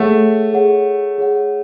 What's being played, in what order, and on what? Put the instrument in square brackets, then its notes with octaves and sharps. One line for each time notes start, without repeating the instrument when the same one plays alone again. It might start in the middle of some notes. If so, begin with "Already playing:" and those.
Already playing: [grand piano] A3 [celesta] G#4 C#5 F#5
[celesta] G#4 C#5 F#5
G#4 C#5 F#5